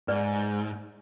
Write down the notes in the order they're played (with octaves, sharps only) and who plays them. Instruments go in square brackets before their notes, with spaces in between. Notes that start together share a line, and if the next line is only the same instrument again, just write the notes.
[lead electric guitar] G#2 [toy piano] B4 D5